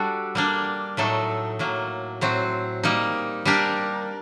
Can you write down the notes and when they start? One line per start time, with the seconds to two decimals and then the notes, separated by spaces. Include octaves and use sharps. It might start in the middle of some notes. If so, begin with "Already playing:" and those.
Already playing: G3 D4 F#4 A4
0.35 G3 A#3 D4
0.97 A2 F#3 A3 D#4 A4
1.59 A2 F#3 A#3
2.21 A2 F#3 C4 F#4
2.83 G3 A#3 D#4
3.45 G3 D4 G4 A#4